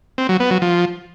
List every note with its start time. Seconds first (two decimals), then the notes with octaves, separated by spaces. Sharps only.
0.18 C4
0.29 F#3
0.40 B3
0.51 F#3
0.62 F3